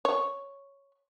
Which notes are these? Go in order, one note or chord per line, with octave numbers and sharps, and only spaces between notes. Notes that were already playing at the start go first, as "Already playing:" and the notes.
C#5